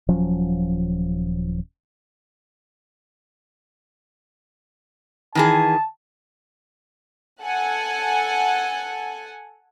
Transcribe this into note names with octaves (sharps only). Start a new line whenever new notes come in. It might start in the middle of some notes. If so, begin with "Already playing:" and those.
D#1 F3 F#3 C#4
D#3 E3 G#4 A5
A4 F#5 G#5